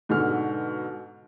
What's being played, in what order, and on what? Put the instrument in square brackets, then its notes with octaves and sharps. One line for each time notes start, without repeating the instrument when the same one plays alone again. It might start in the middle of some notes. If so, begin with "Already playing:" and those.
[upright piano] G#2 B2 D3 G#5 F6